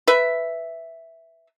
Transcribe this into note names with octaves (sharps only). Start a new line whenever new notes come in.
B4 E5